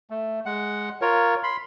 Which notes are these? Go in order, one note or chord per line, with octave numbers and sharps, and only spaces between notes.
A3
G#3 F#5
F4 A#4 C#5
B5 C6